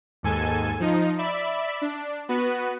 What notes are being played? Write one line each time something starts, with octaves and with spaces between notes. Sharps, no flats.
D#2 G#2 A4 G#5
F3 D#4
D5 E5 B5
D4
B3 F#4 B4